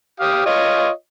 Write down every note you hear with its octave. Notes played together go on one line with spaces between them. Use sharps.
G4 F5 D#6
F4 C#5 D#5